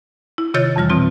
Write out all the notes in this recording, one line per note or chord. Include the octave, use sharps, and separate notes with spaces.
E4
C3 D#3 F4 C#5 G6 A6
F2 E3 G3 F6
B2 E3 C4 F4